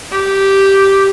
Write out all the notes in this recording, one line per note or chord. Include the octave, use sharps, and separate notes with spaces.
G4